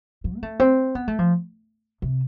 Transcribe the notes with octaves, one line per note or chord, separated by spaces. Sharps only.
F3
B3
A3
C4
B3
A3
F3
C3